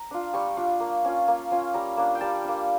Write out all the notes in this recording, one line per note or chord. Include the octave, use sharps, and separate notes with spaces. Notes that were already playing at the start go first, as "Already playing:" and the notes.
Already playing: A#5
D4 F4
G3 C#6
D4 F4
A#3
C#4 F4
A#3
C#4 F4
G3 A#5
A#3 D4
G5
G3 A5
A#3 D4